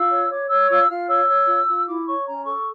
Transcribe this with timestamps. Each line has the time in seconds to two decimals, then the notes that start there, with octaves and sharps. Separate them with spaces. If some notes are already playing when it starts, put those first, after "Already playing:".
Already playing: F4 E6
0.10 C#5
0.30 C#5 D6
0.49 C#5 E6
0.69 F4 E6
0.89 F4 F6
1.09 C#5 E6
1.28 C#5
1.47 F4
1.67 F4
1.86 E4 D6
2.06 C#5 C#6
2.26 C#4 A#5
2.44 A4 C#6